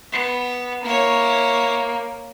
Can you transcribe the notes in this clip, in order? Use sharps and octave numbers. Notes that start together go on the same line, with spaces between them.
B3
A#3 E4 C#5